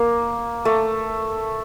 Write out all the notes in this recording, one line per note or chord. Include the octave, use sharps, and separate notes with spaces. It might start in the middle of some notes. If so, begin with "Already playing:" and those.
Already playing: A#3
A3